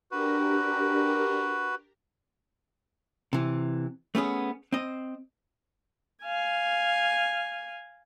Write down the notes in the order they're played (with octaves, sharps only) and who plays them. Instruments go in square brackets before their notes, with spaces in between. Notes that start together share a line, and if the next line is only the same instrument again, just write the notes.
[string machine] D4 G4 A#4 [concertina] F#4 B4
[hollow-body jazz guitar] C3 E3
A3 B3 C#4 G#4
C4 D#5
[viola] F5 G#5